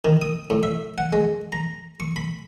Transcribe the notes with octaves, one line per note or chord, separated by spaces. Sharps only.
D#3
D#6
A2
E5
F#5
G#3
A#5
C#6
B5